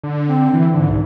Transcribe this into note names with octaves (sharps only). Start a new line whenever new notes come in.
D3
C4
E3
G#2 D3
C2